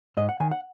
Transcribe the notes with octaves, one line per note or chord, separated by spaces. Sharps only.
G#2 D#5
F#5
D#3 G#5
F#5